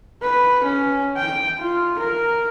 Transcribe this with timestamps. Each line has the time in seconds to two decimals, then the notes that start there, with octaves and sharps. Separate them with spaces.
0.22 B4
0.64 C#4
1.17 G5
1.59 F4
1.99 A#4